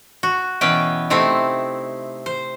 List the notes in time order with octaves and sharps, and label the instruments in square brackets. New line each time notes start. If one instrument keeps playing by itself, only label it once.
[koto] F#4
B2 E3 B3 C#4 B4 G5
C3 A3 C4 D#4 E4
C5